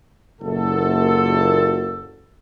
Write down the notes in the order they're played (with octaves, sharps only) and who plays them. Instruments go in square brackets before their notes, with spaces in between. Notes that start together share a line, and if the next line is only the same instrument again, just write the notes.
[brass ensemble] F#1 A#2 F#4 A4